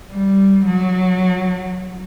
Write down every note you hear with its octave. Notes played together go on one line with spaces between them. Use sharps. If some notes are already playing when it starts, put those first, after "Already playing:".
G3
F#3